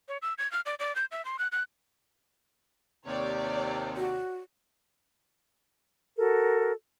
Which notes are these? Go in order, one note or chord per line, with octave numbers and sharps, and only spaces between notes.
C#5
E6
G#6
F6
D5
D5
G6
E5
C6
F#6
F#6
D#2 C3 C#5 D5
F#4
F#4 A4 A#4